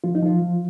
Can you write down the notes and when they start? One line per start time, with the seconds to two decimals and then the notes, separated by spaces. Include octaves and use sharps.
0.04 F3 F4
0.15 D#4
0.22 F3 F4
0.42 F3